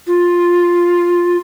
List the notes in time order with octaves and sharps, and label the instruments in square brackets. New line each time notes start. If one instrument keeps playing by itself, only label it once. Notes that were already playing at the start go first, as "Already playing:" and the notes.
[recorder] F4